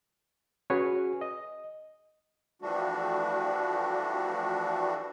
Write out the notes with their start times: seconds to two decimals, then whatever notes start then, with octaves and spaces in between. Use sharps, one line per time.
0.70 C#4 F#4 G#4 B4 C#5 G#5
1.21 D#5
2.62 E3 F3 G3 A3 D4 F#4